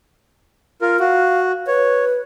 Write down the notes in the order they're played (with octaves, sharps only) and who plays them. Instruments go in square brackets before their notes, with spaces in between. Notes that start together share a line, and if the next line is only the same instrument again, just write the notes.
[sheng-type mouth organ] F4 A#4
[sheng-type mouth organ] F#4 [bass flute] F5
[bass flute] B4 [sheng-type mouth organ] C#5